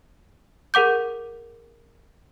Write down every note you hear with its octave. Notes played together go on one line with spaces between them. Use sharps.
G#4 A#4 F#5 D6 G6